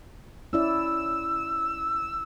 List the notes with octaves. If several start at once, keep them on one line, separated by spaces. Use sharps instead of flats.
C#4 E4 D5 E6